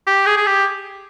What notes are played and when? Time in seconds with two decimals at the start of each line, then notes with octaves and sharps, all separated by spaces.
0.07 G4
0.26 G#4
0.37 G#4
0.47 G4